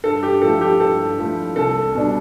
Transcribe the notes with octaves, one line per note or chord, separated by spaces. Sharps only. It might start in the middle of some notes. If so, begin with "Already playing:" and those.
G2 A4
G4
F3 A3 E4 A4
G4
G2 A4
F3 A3 E4
C2 A4
B2 G3 D4